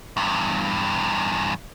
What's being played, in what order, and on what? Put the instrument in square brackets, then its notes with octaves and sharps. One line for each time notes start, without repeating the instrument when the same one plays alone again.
[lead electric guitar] E2 G2